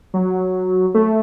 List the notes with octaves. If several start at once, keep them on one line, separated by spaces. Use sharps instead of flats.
F#3
A3